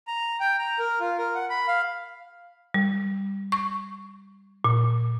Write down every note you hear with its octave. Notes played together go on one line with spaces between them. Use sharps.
A#5
G5
A#5
A#4
F4
A#4
F#5
B5
F5
G3
C#6
A#2